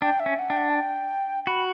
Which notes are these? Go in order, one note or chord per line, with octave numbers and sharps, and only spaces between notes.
D4 G5
E5
C#4
F#5
D4 G5
F#5
A5
G5
F#4 B5